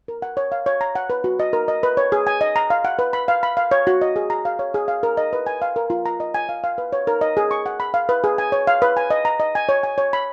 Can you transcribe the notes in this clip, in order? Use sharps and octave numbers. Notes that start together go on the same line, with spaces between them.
A#4
F#5
C#5
F5
C#5
A#5
F#5
B4
F#4
D#5
A#4
D#5
B4
C#5
G#4
G#5
D#5
A#5
F5
F#5
B4
B5
F5
B5
F5
C#5
F#4
D#5
G#4
A#5
F5
C#5
G#4
F5
A#4
D#5
B4
G#5
F5
A#4
F4
A#5
D#5
G#5
F5
F5
B4
C#5
A#4
D#5
G#4
C#6
F#5
B5
F5
B4
G#4
G#5
C#5
F5
B4
G#5
D#5
A#5
D#5
G#5
C#5
G#5
C#5
B5